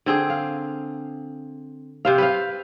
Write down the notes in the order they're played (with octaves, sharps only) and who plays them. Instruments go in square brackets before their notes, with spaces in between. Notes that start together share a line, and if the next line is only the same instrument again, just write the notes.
[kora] D3 C4 G#4
F5
C3 C5 F5
B4 C5 F5